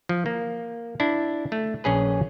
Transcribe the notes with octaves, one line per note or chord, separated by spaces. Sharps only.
F3
A#3
D4 E4
A3
A#1 C#4 G#4 B4